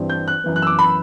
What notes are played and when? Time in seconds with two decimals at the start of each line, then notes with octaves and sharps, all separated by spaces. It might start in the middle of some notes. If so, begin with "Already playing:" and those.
Already playing: G2 E3 G3 C4
0.10 G6
0.28 F#6
0.44 F#2 E3 B3
0.56 F#6
0.62 E6
0.67 D6
0.79 B5